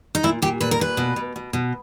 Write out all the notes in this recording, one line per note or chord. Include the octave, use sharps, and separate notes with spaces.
D#4
A#2 E4
A#2 G4
A#2 B4
A#4
A#2 B4
B2
B2
B2
B2